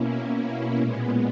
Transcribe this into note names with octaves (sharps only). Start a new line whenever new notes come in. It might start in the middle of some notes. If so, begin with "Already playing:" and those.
Already playing: B2 A#3 C#4 E4
A#2 G#3 B3